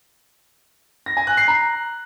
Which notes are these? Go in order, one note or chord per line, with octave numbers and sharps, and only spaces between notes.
A#6
G#5
F#6
C7
A#5